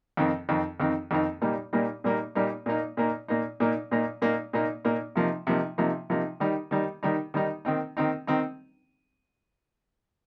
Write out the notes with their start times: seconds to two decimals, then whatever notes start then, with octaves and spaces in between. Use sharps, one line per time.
0.17 F2 D#3 C4 D#4
0.49 F2 D#3 C4 D#4
0.80 F2 D#3 C4 D#4
1.11 F2 D#3 C4 D#4
1.42 A#2 G3 A#3 D#4
1.73 A#2 G3 A#3 D#4
2.04 A#2 G3 A#3 D#4
2.35 A#2 G3 A#3 D#4
2.66 A#2 A#3 D#4
2.97 A#2 A#3 D#4
3.28 A#2 A#3 D#4
3.60 A#2 A#3 D#4
3.91 A#2 A#3 D#4
4.22 A#2 A#3 D#4
4.53 A#2 A#3 D#4
4.85 A#2 A#3 D#4
5.15 C3 F3 A#3 D#4
5.47 C3 F3 A#3 D#4
5.78 C3 F3 A#3 D#4
6.10 C3 F3 A#3 D#4
6.40 D#3 G3 D#4
6.71 D#3 G3 D#4
7.03 D#3 G3 D#4
7.34 D#3 G3 D#4
7.65 D#3 C4 D#4
7.97 D#3 C4 D#4
8.27 D#3 C4 D#4